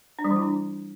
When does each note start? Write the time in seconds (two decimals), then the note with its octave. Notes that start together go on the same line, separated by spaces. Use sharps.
0.19 D4
0.24 G3
0.30 E3
0.36 E4
0.42 D4